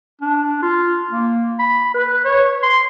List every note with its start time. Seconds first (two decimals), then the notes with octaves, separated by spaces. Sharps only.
0.22 D4
0.62 F4
1.11 A#3
1.59 B5
1.94 B4
2.25 C#5
2.63 C6